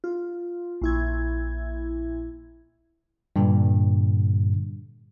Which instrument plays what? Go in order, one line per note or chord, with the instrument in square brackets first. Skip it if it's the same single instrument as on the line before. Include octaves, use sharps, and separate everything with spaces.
[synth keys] F4
A#1 E4 G#6
[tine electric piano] G2 A#2 D3